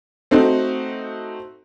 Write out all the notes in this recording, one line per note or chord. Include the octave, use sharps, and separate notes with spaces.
A3 C4 D#4 F#4